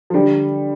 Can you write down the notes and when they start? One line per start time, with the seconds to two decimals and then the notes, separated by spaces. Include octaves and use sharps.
0.10 F3
0.14 D3 G3